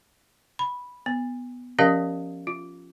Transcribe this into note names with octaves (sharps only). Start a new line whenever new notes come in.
B5
B3
F3 C#4 G4 A#4 D#5 F5
F4